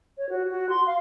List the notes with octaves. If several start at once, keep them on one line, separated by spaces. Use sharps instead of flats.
C#5
F#4
F#4
C6
F5